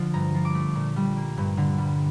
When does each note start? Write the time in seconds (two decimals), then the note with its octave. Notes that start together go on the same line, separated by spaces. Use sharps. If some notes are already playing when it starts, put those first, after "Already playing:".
Already playing: D3 F3
0.13 G2 A#5
0.35 F3
0.45 D6
0.55 A3
0.75 A#2
0.96 G3
1.16 A#3
1.38 G2
1.57 D3
1.78 G3